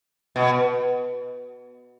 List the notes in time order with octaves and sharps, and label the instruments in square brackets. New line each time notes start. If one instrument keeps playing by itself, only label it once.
[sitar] B2